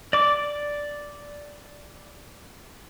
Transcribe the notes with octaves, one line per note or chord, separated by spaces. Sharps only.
D5 D6